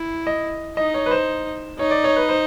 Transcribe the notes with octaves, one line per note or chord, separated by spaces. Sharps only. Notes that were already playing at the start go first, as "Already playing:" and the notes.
Already playing: E4
D#5
D#4 D#5
C#5
B4
C5
D#4 C#5
D5
C#5
B4
C5